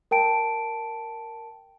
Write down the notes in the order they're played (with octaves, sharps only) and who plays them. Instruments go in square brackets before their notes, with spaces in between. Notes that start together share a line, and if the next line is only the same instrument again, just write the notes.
[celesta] A#4 G5 A5 D7